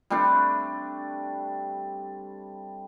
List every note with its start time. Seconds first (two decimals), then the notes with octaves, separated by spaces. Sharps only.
0.10 G3 A3 C4 D4